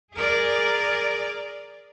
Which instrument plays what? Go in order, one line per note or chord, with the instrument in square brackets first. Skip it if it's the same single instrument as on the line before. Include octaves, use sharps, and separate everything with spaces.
[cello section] G#4 A#4 D5